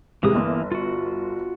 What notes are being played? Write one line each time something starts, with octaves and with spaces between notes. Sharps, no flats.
C3 E3 G3 G#3 A#3 D#6
G1
F4 F#4